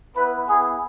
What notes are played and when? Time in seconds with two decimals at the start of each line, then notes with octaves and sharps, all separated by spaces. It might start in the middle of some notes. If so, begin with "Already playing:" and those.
0.16 B3 E4 B4
0.48 B3 E4 G#4